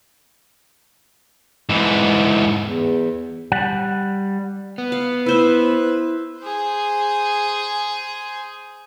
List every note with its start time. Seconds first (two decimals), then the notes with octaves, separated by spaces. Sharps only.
1.69 G#2 E3
2.63 E2
3.52 G3 F#5
4.78 B3
4.92 F5
5.26 E4 B4 C5 E5
6.39 G#4 C5